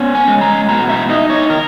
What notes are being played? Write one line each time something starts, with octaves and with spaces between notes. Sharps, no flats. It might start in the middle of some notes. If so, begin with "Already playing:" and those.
Already playing: B3 C#4
G#5
G#3
A#5
B2 A#5
E5
D#4 D#5
C#5
A#4